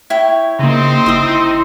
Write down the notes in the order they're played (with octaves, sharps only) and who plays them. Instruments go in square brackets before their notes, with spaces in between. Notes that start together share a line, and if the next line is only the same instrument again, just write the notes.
[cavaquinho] E4 C#5 G5
[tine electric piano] C#3 A#3 [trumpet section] C4 D#4 C5
[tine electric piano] G1 E4 E6 [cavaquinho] C6 D#6